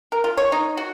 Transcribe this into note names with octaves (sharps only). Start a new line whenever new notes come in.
A#4
F4
C#5
D#4
F#4